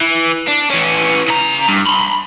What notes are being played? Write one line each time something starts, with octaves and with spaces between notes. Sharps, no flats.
E3
D4
E3 C#4
C#3 A#5
G2
B5 C6